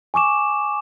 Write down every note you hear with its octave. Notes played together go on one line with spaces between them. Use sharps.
G#5 C#6 D6 E7